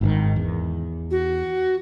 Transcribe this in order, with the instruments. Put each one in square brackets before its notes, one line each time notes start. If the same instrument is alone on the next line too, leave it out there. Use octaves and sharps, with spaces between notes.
[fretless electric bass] G#1 G#2 D#3
E2
[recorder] F#4